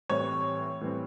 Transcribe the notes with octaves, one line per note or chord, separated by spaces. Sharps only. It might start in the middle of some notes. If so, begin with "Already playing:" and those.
A2 E3 G3 C4 C#5
A2 E3 G3 C4